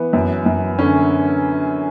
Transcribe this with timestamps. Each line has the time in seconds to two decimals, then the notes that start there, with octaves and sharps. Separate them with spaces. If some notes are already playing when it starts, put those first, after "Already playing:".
Already playing: E3 B3
0.13 F#2
0.46 F#2
0.79 D3 C#4